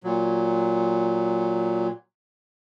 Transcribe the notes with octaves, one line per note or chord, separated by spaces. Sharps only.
A#2 F#3